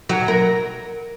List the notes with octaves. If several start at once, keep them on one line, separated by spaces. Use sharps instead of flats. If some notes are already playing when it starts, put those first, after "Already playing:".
F#3
A#4